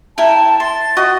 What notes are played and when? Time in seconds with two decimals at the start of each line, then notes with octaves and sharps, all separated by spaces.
0.18 E4 A#4 G5 A5
0.60 C6 A6
0.97 F#4 D#5 D#6